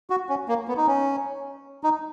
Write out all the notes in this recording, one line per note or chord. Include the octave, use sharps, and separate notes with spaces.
F#4
C#4
A#3
B3
D#4
C#4
D#4